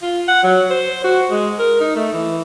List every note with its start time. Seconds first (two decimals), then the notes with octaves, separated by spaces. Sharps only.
0.02 F4
0.28 F#5
0.44 F#3
0.71 C5
1.05 F#4
1.31 G#3
1.59 A#4
1.81 D#4
1.96 A3
2.14 E3